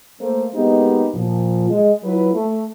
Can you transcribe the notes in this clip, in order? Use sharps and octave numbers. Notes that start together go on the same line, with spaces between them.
A3 A#3 C5
G#3 A#3 B3 D#4 G4
A#2 F3
G#3
F#3 E4 F4 B4
A3